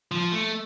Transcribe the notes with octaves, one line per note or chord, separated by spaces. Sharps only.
F3
A3